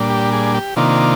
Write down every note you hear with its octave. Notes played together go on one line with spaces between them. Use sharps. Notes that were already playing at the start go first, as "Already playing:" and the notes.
Already playing: A#2 G3 D4
G4
G#4
G4
C3 D#3 A#3 D4 F4